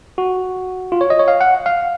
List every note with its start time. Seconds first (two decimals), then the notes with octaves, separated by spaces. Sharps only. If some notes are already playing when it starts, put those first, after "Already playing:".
0.18 F#4
0.92 F4
1.01 C#5
1.10 D#5
1.19 C#5
1.28 F5
1.41 F#5
1.66 F5